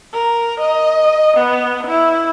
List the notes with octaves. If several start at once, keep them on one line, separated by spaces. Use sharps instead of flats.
A#4
D#5
B3
E4